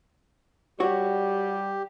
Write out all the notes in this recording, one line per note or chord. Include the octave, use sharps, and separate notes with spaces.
G3 F#4 G4 C#5